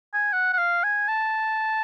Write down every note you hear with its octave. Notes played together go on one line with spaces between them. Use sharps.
G#5
F#5
F#5
F5
G#5
A5